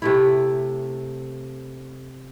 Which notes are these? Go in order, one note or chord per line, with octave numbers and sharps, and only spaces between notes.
C3 A3 E4